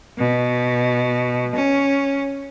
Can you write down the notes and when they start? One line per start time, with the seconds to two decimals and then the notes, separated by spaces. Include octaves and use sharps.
0.18 B2
1.55 C#4